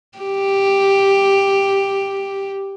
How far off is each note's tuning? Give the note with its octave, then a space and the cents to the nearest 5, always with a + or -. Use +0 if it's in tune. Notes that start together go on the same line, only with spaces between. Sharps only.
G4 +5